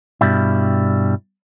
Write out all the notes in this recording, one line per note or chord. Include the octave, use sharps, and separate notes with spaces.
G2 B2 G3 E4